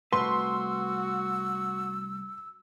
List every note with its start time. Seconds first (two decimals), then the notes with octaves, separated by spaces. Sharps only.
0.13 C2 A3 F#4 B4 C6 E6